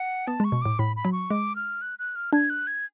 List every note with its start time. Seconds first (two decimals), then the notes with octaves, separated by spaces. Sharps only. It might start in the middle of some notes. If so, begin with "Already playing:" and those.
Already playing: F#5
0.27 B3 A5
0.40 G#3 C#6
0.52 B2
0.62 A2 D6
0.79 A2 B5
0.96 B5
1.05 F#3
1.12 C#6
1.31 G#3 D6
1.56 F6
1.82 F#6
1.99 F#6
2.16 F6
2.33 D4 G#6
2.50 F#6
2.67 G#6